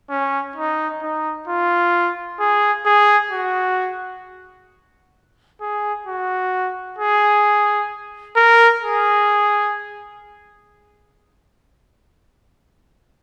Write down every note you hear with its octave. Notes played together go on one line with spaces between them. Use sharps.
C#4
D#4
D#4
F4
G#4
G#4
F#4
G#4
F#4
G#4
A#4
G#4